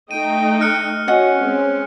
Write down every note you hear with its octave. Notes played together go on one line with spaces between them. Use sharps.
A3 D#4 D#5 G5 D#7
F6 F#6 C#7
C#4 F#4 D#5 F#5
G#3 C4